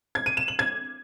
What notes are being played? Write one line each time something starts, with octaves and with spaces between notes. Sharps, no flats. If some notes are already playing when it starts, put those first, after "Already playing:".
G#6
D#7
E7
F#7
G#6